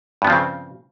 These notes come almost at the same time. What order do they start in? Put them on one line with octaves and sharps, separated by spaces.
G2 B3 F3 C4 C#3